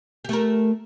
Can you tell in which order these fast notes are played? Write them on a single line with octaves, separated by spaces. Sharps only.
G4 A3 A#4